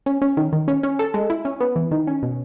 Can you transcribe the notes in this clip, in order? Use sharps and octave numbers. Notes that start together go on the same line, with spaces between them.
C#4
C#4
D#3
D#3
C#4
C#4
A4
G#3
E4
C#4
B3
E3
D#3
C#4
B2